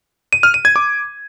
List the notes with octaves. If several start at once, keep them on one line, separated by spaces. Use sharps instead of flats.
D#7
F6
D#7
G#6
D6